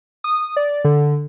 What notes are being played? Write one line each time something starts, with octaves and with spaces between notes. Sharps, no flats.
D#6
D5
D3